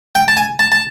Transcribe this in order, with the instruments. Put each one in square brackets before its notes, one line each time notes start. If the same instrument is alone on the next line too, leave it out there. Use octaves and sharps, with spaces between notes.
[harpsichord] G5
A5
G#5
A5
A5